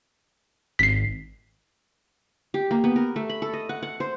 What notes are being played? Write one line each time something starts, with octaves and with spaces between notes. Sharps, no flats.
G#1 B6 C7
G4
A#3
B3
A#4
A3
B5
A4
D#5
F#5
F#5
C5